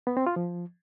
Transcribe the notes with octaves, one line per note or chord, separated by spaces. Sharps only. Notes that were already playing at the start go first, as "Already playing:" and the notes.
B3
C4
F4
F3